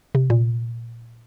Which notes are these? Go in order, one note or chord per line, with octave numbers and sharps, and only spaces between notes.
C3
A#2